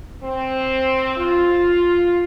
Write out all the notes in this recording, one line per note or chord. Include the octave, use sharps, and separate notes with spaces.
C4
F4